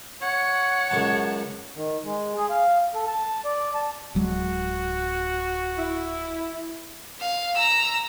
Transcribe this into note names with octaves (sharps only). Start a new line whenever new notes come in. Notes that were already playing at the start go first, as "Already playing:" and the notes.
C#5 F#5
C#2 F#2 A5
D#3
G#3
G#4
F5
A4
A5
D5
A5
D1 F#3 G#3 F#4
E4
F5
A#5 E6